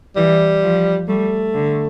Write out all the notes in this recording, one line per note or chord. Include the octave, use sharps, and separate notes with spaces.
E3 G3
F3
G3 A3
D3